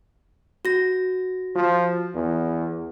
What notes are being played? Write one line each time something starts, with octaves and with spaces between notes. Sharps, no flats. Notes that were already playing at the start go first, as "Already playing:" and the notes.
F#4 A#6
F3
E2